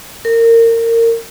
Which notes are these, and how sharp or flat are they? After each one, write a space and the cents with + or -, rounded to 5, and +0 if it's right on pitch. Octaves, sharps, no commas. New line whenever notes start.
A#4 -25